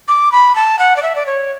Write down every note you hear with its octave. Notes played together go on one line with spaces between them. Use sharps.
D6
B5
A5
F#5
D5
E5
D5
C#5